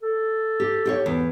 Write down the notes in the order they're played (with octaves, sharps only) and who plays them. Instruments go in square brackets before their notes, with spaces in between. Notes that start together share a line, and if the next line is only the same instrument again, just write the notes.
[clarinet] A4
[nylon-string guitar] G4
G4 C5 C#5
E2